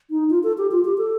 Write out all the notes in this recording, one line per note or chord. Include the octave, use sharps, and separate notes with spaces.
D#4
F4
A4
G4
F4
G4
A4